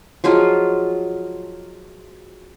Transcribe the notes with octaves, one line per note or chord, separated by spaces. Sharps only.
F3 F#3 G#3 F4